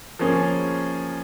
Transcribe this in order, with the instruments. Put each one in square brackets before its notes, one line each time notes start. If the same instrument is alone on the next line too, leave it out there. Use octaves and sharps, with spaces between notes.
[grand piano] F3 A#3 C#4 G#4